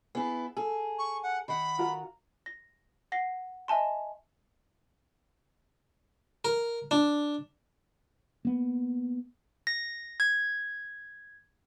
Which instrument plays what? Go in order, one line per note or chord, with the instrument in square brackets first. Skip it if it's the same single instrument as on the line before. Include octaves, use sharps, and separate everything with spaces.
[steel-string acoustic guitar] B3 E4 [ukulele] G#4
[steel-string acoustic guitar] G#4 [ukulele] A4
[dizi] C#6
F#5
[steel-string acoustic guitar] D#3 F#5 [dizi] B5
[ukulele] F4 F#4 A#4
[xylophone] A#6
F#5 A#6 C7
D#5 E5 G#5 A5 C6
[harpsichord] A#4
D4
[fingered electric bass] A#3 B3
[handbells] A#6
G#6